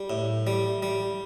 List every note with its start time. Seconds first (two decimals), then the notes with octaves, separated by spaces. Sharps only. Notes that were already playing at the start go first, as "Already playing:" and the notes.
Already playing: G3
0.10 A2
0.47 G3
0.83 G3